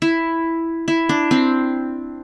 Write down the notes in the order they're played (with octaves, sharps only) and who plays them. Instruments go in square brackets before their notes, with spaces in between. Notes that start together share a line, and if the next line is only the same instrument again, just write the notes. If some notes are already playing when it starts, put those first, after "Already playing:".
[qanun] E4
E4
D4
C4